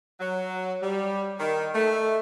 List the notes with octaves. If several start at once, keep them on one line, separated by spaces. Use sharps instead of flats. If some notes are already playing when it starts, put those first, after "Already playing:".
F#3
G3
D#3
A3